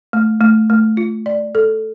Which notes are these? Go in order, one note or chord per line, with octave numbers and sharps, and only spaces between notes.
A3
A3
A3
F4
D5
A4